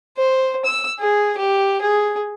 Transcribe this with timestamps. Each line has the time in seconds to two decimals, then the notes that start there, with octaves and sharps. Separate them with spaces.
0.17 C5
0.65 E6
1.00 G#4
1.38 G4
1.81 G#4